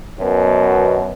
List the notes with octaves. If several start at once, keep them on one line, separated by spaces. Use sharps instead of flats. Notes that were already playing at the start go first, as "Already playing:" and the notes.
F#2 B2